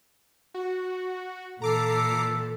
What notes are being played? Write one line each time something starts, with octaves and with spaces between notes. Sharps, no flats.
F#4
A#2 E3 A4 A#5 D6 C7